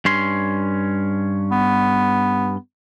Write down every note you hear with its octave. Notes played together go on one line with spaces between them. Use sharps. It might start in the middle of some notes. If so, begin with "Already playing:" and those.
G2 C#4 C6
B3